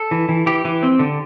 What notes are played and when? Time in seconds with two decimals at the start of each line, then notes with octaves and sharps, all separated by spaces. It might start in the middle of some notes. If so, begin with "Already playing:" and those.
Already playing: A4
0.11 E3
0.29 E3
0.46 E3 G4
0.65 E3
0.83 C4
0.99 D3